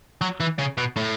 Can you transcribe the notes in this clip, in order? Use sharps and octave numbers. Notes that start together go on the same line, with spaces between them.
F#3
E3
C#3
B2
A2